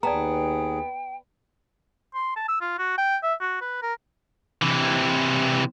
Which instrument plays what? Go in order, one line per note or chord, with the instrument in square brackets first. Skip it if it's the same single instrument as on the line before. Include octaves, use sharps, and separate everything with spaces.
[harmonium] D#2 G#4 [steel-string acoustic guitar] B3 [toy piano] D5 A5 A#5 [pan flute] G5
[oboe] C6
A5
E6
F4
F#4
G5
E5
F#4
B4
A#4
[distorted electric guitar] C3 E3